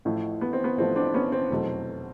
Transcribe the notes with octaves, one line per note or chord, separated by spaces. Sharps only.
A1 A2 F3 A3
B3
C4
B3
A1 A2 F3 A3 C4
C4 D4
B3 C#4
C4
F1 E2 B2 F#3 A3